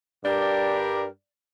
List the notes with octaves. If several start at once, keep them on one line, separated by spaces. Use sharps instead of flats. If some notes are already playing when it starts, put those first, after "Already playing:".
G2 G3 D4 G4 A#4 D5
D5